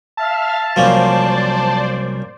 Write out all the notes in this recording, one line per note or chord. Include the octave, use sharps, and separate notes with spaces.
E5 F5 A5 F6
C2 F3 F#3 A#3 C#4 C5 D5